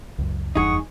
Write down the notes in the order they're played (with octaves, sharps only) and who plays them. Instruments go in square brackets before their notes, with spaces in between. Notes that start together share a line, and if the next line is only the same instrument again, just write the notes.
[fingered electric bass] C#2 F#2
[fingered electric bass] F1 E2 G2 [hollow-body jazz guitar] D#4 G#4 [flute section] F#5 C#6 D#6